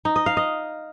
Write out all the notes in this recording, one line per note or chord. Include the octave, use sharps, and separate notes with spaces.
D#4
D#5
F5
D#5